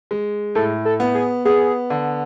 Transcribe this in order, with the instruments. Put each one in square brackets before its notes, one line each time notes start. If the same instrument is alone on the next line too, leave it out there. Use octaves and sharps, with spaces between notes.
[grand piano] G#3
[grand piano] A2 [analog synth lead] A4
[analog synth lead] A4
[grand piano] B3
[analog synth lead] G#4
[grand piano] B3 [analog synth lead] G#4
[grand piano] D3